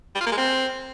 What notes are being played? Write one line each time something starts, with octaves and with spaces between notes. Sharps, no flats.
G3
F4
A#3
G#3
C4